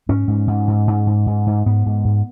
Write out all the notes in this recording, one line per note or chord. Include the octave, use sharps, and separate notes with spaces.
G#2 C#4
G#2
G#2
G#2
G#2
G#2
G#2
G#2
G#2 B3
G#2
G#2